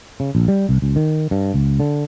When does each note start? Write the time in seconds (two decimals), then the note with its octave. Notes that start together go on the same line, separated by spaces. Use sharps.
0.20 C#3
0.35 A#1
0.48 G3
0.69 C2
0.82 C#2
0.96 D#3
1.31 G2
1.54 C#2
1.80 D3